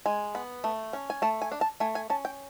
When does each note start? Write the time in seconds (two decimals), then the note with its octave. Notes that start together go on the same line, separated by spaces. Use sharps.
0.06 G#3 G#5
0.35 B3
0.64 A3
0.93 C#4
1.10 G#5
1.22 A3 A5
1.42 G#5
1.52 D4
1.61 A5
1.80 A3 G#5
1.95 G#5
2.10 C#4 A5
2.25 G5